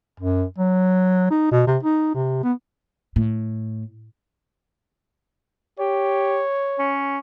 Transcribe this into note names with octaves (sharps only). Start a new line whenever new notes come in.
F#2
F#3
D#4
B2
C3
D#4
C3
B3
A2
G4 C#5
C#4